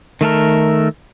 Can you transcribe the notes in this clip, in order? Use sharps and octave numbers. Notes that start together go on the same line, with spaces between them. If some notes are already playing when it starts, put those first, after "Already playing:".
D#3 A3 A4 A#4